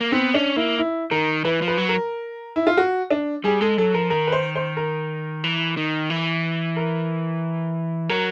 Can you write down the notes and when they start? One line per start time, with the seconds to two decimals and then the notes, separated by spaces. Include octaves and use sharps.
0.01 A#3
0.12 B3 C4
0.34 C#4 D4
0.56 A#3 E4
0.78 E4
1.11 D#3 A#4
1.45 E3 B4
1.62 F3
1.68 B4
1.78 F#3
1.89 A#4
2.56 E4
2.67 F4
2.77 F#4
3.11 D4
3.44 G3 G#4
3.61 G#3 A4
3.77 F#3 A4
3.94 F3 A#4
4.10 D#3 A#4
4.27 B4
4.32 C5
4.56 C5
4.77 A#4
5.44 E3
5.77 D#3
6.10 E3
6.77 A#4
8.09 F#3 A#4